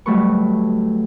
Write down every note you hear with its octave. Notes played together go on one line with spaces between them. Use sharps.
D2 F#3 G3 A3 B4 C#6